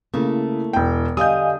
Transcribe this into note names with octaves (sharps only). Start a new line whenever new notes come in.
C#3 A3 A#3 E4
E1 G5
D3 G3 D#5 F5 G#5 D#6 G6